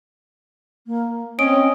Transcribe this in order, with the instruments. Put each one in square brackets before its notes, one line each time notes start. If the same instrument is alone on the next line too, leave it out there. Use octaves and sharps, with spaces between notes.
[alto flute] A#3
[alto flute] C4 [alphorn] C#4 [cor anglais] D#5 [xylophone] D7